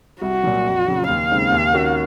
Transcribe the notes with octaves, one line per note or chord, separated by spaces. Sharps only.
C2 F#4
A#2 F#3
F2
C#3 F#3
D#2 F5
C#3 G#3 C4 D#4
D#2
D#3 A#3 C#4 F#4